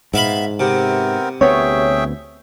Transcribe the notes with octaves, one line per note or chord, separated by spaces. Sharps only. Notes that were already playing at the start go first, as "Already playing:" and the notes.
G#2 B3 E5 F5 B5
C3 B3 C4 A#4
D2 B3 C4 G#4 C#5 E5 G5